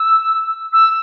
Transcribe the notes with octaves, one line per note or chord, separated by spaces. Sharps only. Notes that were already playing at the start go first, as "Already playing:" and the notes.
Already playing: E6
E6